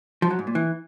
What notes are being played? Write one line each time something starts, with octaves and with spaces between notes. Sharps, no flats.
F3
F#3
G#2
A#2
E3